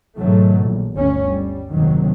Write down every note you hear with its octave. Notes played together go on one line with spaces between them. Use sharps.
G#2 B2 D#3 F#3 A3
A#1
G1 D2 D3 C#4
G3
F#1 D#2 C3 D#3 F#3